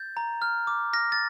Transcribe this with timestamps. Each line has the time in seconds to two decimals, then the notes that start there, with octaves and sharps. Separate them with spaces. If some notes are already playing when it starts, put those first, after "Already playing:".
Already playing: G6 A6
0.17 A#5
0.42 F6
0.67 D6
0.93 F6 A#6
1.12 A6